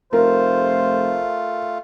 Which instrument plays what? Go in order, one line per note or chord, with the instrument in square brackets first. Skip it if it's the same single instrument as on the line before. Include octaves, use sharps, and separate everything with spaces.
[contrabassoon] F1 [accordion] A3 F4 [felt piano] A#4 [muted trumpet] C5